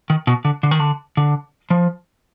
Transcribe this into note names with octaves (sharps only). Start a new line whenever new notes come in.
D#3
B2
D3
D3
D#3
D3
D3
F3